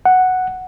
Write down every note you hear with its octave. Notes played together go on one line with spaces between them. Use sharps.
F#5